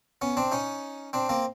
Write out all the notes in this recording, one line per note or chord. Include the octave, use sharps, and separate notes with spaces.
B3 C#4
C4 D4
C#4 D#4
C4 D4
A#3 C4